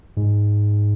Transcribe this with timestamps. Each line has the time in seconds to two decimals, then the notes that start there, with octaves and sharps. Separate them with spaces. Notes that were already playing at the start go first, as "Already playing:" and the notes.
0.17 G#2